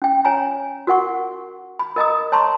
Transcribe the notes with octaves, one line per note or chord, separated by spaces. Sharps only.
C#4 G5
C#5 G#5 A#5
F#4 A#4 F#5 C#6
B5
A#4 D#5 A#5 D#6
C#5 A5 A#5 C6 C#6